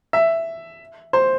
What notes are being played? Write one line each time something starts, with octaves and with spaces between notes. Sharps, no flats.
E5
C5